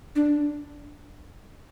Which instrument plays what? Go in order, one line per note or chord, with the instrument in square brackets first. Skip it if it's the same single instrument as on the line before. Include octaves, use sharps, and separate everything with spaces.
[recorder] D4